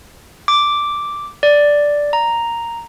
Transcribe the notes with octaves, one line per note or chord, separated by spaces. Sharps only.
D6
D5
A#5